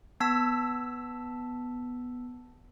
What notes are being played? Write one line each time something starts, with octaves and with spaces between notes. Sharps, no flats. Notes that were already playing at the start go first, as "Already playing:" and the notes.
B3 A5 E6 B6